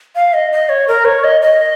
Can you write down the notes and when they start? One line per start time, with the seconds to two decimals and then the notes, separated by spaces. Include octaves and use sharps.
0.16 F5
0.33 D#5
0.52 D#5
0.69 C#5
0.88 A#4
1.05 C#5
1.24 D#5
1.42 D#5